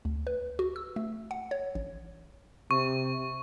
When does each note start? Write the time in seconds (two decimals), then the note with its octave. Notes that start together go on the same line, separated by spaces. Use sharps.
0.05 D2
0.27 B4
0.59 F#4
0.76 E6
0.96 A3
1.31 F#5
1.51 C#5
1.75 A1
2.71 C3 C#6